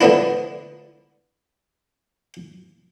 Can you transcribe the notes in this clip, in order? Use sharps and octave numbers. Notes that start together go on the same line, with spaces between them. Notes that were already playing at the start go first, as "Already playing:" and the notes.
D3 F3 B3 D4 E4